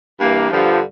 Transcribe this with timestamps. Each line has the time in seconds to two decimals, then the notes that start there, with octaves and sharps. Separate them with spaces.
0.19 G2 E3 A#3
0.50 G2 D3 F3